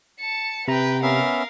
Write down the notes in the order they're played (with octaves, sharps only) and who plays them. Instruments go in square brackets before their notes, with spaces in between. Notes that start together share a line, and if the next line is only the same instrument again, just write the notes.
[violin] A5 C#7
[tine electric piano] C3 A#5 [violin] B4 G5
[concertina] B3 C#4 E5 [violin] A#4 F5